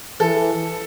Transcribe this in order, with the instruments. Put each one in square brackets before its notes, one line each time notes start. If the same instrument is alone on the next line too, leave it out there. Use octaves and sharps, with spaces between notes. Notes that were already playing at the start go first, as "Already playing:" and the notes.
[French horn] E3 [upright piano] A4